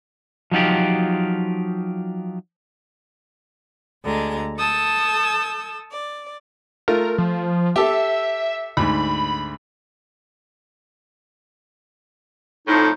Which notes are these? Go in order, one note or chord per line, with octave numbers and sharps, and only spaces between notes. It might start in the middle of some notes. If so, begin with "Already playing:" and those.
F3 F#3 D#4 F4 G4
D2 D3 G#3 A#5
A4 A5 D#6 E6 G6
D5
A3 F4 A#4
F3
G4 A4 E5
D2 G#2 B5
F2 A2 D#4